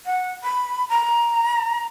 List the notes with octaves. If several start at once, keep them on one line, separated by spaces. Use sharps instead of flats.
F#5
B5
A#5